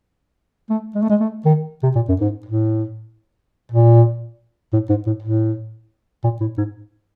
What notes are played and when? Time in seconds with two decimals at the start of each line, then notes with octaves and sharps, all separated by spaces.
0.70 A3
0.95 G#3
1.02 A3
1.10 G#3
1.20 A3
1.45 D#3
1.83 C3
1.95 A#2
2.09 F#2
2.21 G#2
2.46 A2
3.72 A#2
4.73 A2
4.89 G#2
5.07 A2
5.23 A2
6.24 A#2
6.41 A2
6.58 G#2